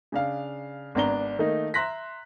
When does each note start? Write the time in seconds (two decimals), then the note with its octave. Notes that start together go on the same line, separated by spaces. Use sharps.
0.12 C#3 D4 F5
0.95 G#1 B3 D4 A#5 G7
1.39 D#3 A3 A#3 D#4
1.74 E5 A#5 C6 F#6 A#6 B6